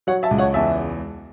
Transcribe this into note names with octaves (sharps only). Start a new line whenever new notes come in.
F#3 C#5 F#5
E5 A5
C#2
C#5 F#5
E2 E5 A5